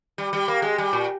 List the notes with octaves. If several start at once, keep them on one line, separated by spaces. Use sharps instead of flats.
G3
G3
A#3
G#3
G3
A#2